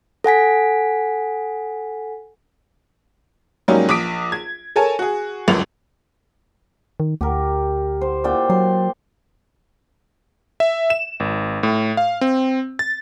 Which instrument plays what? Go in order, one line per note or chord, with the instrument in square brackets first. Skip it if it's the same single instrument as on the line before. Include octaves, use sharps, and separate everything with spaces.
[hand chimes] A4 F#5 G#5 B6
[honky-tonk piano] G#2 F#3 G3 A#3 C#4 D#4
A#1 D6 D#6 B6 D7
G#6
A4 A#4 C#5 G#5 A5
F#4 G#4
G1 C#2 F#2 F7
[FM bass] D#3
[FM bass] D2 [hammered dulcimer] G4 A#4
[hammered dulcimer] C5
A#2 D5 G5
[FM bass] F#3 [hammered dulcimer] C6
[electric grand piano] E5
E7
G#1
A2
F5
C4
A6